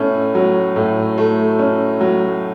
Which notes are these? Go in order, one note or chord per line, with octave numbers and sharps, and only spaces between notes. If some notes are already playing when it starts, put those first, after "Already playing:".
Already playing: A2 A3 C#4
F#3
A2
A3
C#4
F#3